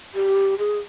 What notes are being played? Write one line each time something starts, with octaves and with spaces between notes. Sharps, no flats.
G4
G#4